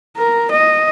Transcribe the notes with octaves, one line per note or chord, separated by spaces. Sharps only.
A#4
D#5